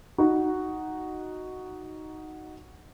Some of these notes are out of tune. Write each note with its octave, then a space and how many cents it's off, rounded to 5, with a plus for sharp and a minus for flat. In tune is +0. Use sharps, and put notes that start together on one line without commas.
D#4 +0 F#4 +0